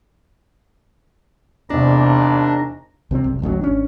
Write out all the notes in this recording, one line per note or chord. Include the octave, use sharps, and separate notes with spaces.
A#1 E2 C3 D4 D#4 D#5
C2 C3 E3 C4
F#1 C2
D#1 A1 D2 F#3
G#1 C#4 D4